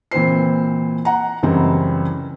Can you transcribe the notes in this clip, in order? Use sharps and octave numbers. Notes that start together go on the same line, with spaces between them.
A#2 E3 C4 B4 C5 C7
F#5 A#5
C#2 F#2 E3 G3 C4